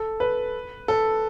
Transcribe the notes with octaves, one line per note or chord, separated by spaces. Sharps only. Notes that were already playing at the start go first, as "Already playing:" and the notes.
Already playing: A4
B4
A4